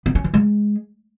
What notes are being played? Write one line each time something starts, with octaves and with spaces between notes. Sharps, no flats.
B3
C#4
E3
G#3